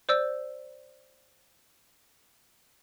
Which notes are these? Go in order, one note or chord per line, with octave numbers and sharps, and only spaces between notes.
C5 D5 E6